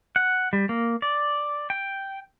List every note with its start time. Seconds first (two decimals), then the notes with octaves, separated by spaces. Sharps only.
0.16 F#5
0.53 G3
0.69 A#3
1.02 D5
1.70 G5